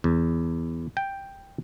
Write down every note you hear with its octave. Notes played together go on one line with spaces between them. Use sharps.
E2
G5